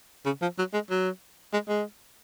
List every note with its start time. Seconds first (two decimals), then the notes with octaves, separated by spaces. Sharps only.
0.26 C#3
0.42 F3
0.58 F#3
0.73 G#3
0.90 F#3
1.53 G#3
1.68 G#3